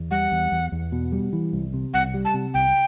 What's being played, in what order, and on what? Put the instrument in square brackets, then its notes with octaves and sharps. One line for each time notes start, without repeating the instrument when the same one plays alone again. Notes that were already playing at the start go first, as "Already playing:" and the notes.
Already playing: [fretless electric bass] E2
[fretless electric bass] G3 [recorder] F#5
[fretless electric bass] E2
E2
E2
B2
G3
E3
C2
C3
[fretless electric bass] C2 [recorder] F#5
[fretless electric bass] G3
[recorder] A5
[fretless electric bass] C3
[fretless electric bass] C2 [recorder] G5